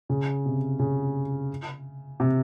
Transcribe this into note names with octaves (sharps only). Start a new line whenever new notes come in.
C#3
C3
C#3
C3